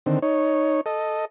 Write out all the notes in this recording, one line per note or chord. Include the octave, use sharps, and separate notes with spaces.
D3 D#3 C4
D#4 C#5
A4 D#5